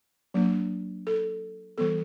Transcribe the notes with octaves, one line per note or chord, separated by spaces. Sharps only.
F#3 A#3 D4
A4
E3 G3 B3 A4